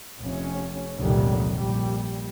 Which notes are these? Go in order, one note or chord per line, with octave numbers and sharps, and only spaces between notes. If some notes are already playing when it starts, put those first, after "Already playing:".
F1 C#4
F1 C#2 A#2 D#3 F#3 G3
A#1 G3